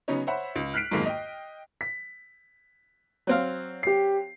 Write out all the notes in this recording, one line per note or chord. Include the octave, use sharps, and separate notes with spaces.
C#3 F#3 B3 C#4 D#4 C#5
C5 C#5 E5 F#5 B5
C#2
F6 F#6 B6 C7 D7
B1 F2 G#2 D#3 G#3 A#3
D#5 G5
B6
F#3 C4 F5
G4 C7